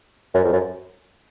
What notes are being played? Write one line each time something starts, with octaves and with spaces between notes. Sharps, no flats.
F#2
F2
F#2